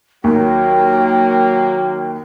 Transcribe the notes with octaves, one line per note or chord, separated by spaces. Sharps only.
D#2 F#3 A#3 G5